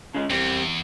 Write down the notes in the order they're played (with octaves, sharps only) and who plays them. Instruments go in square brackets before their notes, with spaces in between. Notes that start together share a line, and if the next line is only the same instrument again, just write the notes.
[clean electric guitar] C#3 G#3
[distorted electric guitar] E2 [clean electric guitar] G3 C4